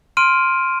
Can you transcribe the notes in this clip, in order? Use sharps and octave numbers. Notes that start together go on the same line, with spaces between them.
C6 F6 D7 D#7